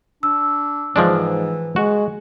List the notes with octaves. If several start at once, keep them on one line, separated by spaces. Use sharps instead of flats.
D4 E6
G#2 E3 F3 G#3 D4
G#3 F#4